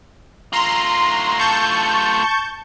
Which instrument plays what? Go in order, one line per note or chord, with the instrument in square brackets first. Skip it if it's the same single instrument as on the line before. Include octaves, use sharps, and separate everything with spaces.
[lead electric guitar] A3 F4 [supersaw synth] A#5 C6
[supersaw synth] A5 C#6 G6